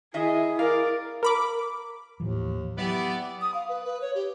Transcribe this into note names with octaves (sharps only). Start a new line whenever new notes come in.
D#3 E4 G#4 D#5 E5
A#4 D5 F5
A#4 B5 D6
D#2 A2 E3 F3
F#3 B3 E4 G4 D5
D#6
F5
B4
B4
C#5
G4